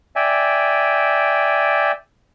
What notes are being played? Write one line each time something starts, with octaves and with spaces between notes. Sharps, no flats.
D5 E5 G5 G#5